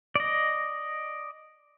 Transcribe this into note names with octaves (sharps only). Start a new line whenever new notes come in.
D5 D#5